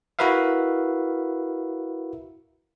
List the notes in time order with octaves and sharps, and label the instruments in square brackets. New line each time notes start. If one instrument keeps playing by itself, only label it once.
[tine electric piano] E4 F#4 A#4 B4 E5 F5